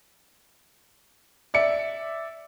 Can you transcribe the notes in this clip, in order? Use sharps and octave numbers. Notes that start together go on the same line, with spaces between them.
D5 E5 C#7